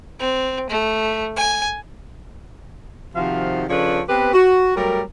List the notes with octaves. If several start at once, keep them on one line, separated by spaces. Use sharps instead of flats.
C4
A3
G#5
C3 D#3 F3 F#4 F5
C#3 F3 D4 A4 B4 C#5
B3 C4 G4 B4
F#4
F#3 G3 A3 A#4